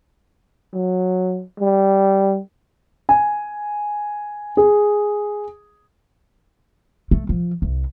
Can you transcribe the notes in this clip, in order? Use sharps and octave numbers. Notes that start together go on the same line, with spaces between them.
F#3
G3
G#5
G#4
A3
F3
C2